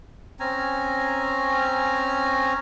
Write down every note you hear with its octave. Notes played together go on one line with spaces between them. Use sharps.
C4 C#4 G#5 A#5